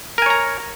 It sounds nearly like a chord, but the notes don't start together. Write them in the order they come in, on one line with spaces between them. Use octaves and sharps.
A#4 G#5 C#5 A#5